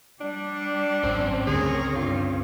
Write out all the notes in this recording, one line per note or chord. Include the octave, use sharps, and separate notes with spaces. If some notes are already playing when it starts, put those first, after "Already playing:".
G3 D4
G#1 F#2 C4 C#4 C5
C#2 D3 A3 G#4 A#4 C#5
G2 F4